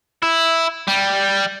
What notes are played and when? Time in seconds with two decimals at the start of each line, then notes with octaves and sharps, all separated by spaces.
0.23 E4
0.88 G3